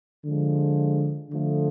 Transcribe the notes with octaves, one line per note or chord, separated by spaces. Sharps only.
D3 F3 G#3
D3 F3 A3